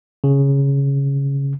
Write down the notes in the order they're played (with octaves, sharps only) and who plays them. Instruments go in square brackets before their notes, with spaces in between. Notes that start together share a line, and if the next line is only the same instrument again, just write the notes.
[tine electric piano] C#3